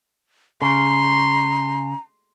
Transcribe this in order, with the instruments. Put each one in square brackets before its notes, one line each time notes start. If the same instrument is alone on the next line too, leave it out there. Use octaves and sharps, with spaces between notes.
[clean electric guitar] C#3 [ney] A#5 [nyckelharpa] C6